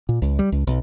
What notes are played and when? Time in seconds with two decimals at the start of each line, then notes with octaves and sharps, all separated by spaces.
0.09 A#2
0.22 C#2
0.39 G3
0.52 C#2
0.67 B1